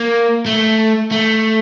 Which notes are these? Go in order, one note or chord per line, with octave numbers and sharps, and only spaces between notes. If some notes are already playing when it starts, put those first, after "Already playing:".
Already playing: A#3
A3
A3